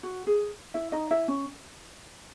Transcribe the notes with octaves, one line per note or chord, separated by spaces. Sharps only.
F#4
G#4
E4 E5
D#4 D#5
E4 E5
C#4